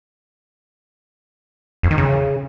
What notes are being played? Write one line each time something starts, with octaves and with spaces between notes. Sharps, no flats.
F2
D#3
C#3